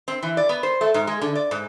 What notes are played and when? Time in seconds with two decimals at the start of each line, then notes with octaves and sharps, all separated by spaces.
0.08 C4
0.23 E3
0.37 D5
0.49 B3
0.63 C5
0.81 A3
0.94 G#2
1.07 G#3
1.21 D3
1.35 D5
1.51 G#2